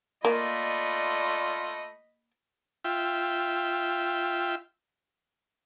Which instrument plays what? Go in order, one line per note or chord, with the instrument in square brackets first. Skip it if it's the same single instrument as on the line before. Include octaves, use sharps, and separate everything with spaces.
[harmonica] A3 F4 [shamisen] A#3 [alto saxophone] D5 [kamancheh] D#5 B5
[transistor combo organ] F4 E5 G5